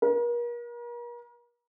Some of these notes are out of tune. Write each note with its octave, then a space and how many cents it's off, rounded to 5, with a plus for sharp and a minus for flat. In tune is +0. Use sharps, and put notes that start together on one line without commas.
A#4 +40